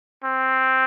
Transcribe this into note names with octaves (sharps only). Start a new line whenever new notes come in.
C4